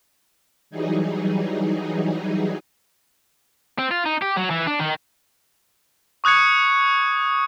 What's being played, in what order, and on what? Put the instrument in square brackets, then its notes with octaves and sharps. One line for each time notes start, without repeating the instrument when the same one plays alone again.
[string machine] E3 F#3 G3 D#4 G#4
[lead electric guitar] C4
F4
D#4
G4
F#3
E3
D4
D#3
[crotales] C#6 D#6 F#6 G#6 C#7